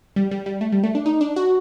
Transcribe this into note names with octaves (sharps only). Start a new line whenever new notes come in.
G3
G3
G3
A3
G3
A3
D4
D#4
D4
F#4